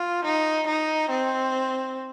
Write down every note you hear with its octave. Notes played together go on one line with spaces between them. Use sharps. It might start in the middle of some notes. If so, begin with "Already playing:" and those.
Already playing: F4
D#4
D#4
C4